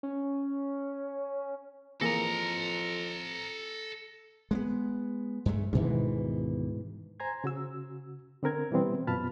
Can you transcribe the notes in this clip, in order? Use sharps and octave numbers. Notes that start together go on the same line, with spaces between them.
C#4
F2 E3 A#3 G#4 A4 A#5 A#6 C#7
G#3 A#3 B3
G2 G#3 A3
D2 G#2 B2 D#3 E3
C5 G#5 A#5 C6 G#6
C#3 F#4 E6
D3 C4 A#4 G#6
B2 E3 G3 B3 C4
F#2 B2 F4 A5 B5 F6